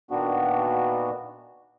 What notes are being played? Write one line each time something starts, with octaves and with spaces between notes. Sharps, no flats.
A#2 D#3 B3 D4 F#4